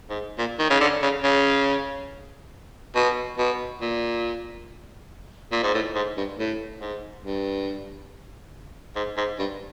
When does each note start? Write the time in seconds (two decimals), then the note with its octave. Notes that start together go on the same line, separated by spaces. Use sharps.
0.09 G#2
0.38 A#2
0.59 D#3
0.70 C#3
0.80 D3
1.02 C#3
1.23 C#3
2.95 B2
3.38 B2
3.81 A#2
5.52 A#2
5.63 G#2
5.74 A2
5.95 G#2
6.17 G2
6.38 A2
6.81 G#2
7.24 G2
8.96 G#2
9.17 G#2
9.39 G2